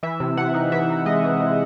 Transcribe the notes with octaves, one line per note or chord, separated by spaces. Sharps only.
E3 E5
C3
C3 F#5
D#4
E3 E5
D#4
G#3 D#5
E3
G#3